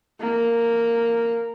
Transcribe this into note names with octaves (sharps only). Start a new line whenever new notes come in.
A#3